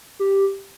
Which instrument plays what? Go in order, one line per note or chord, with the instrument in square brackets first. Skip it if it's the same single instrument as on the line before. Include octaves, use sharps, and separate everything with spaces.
[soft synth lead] G4